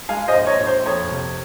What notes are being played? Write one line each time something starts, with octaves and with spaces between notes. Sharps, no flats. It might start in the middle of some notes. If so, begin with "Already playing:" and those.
G#3 F5 G#5
C5 D#5
A#1
C#5
A#1
C5
F2 C#5
C3